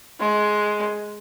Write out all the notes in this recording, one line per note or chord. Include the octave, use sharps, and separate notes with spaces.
G#3